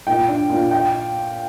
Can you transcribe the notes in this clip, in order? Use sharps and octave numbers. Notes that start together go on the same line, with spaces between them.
A#2 G5
D4
A#2
G5